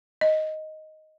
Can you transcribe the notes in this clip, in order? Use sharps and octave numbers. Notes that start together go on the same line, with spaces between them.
D#5